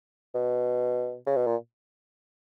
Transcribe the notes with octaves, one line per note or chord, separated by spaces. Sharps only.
B2
C#3
B2
A#2